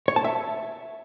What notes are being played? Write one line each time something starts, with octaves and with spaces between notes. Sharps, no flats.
C#5
A5
E5